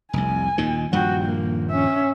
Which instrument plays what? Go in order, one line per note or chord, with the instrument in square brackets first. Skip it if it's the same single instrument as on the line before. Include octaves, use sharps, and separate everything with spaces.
[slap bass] F1 C2 [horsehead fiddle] G#5
[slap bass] D#2 A#2 D#3
[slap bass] D#1 G2 F3 [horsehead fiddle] F#4 G5
[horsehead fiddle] A#3
C#4 E5